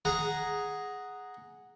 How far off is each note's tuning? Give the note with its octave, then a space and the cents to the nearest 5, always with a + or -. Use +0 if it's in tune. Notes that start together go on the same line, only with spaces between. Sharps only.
G#4 +0 F#5 +0 A#5 +0